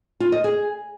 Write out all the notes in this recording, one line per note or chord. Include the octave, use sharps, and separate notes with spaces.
F4
D#5
G#4